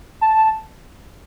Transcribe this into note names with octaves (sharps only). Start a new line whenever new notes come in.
A5